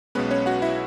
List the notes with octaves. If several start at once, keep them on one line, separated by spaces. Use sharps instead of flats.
B1 B2 G#3 B3 C#4 B4
C#4 C#5
F#4 F#5
E4 E5